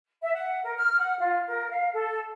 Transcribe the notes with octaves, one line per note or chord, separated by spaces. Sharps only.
E5
F#5
A#4
F6
F#5
F4
A#4
F5
A4